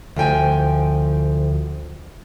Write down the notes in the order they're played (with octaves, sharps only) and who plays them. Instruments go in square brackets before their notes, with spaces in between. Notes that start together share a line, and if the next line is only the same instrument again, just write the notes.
[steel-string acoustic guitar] D2 F3 G5 G#5